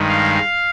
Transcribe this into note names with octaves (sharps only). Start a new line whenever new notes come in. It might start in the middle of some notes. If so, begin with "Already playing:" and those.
Already playing: G2 D#3 G#3
F5